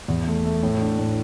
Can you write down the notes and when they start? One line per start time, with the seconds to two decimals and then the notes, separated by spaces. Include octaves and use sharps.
0.08 E2
0.27 A3
0.45 A3
0.63 A2
0.81 D4
0.99 A2